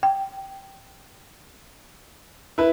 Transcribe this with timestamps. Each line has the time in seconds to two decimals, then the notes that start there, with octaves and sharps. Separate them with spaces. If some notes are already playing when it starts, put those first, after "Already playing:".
0.03 G5
2.58 E4 B4